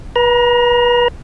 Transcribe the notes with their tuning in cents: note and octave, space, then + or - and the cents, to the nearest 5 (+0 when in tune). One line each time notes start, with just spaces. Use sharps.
B4 -30 A#5 +25